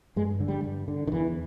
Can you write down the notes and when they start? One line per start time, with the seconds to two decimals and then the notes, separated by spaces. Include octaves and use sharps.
0.16 G2 G#3
0.40 D3
0.48 G3
0.64 G2
0.88 D3
1.07 D#3
1.12 E2 E3